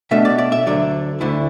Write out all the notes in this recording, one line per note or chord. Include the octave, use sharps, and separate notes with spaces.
B2 A3 D4 E5
D5
D5
E5
D2 D3 F#3 D5
D2 D3 A3 E4